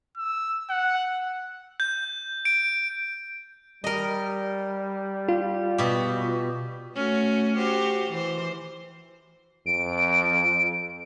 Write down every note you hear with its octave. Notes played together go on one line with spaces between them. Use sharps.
E6
F#5
G6
D7
G3 A#4 D#5
F4
B2 G4
A3 C#4 F#4
F#4 G4 C5
E3 C5
F2 D7